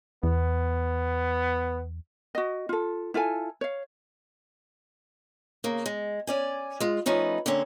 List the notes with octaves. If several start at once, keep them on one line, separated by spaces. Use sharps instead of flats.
E2 B3
F#4 D#5
F4 A4
E4 F4 A4 G#5
C#5 F5
C#3 A#3
G#3
C#4 D5 G#5
G#3 F4
F3 A3 C#4 D#4 B4
D3 A#3 C4 C#4